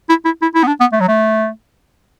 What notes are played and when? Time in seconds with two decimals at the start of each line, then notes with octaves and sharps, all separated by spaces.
0.09 E4
0.25 E4
0.42 E4
0.55 E4
0.63 B3
0.67 D4
0.80 B3
0.92 A3
1.00 F#3
1.08 A3